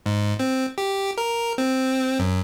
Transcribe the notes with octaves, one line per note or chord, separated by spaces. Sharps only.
G#2
C4
G4
A#4
C4
F#2